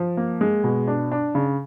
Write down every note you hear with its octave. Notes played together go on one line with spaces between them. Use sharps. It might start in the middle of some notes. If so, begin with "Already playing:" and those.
Already playing: F3
A#3
G#3
B2
D4
D4
C#3